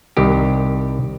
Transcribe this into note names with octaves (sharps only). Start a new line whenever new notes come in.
C2 D#3 G4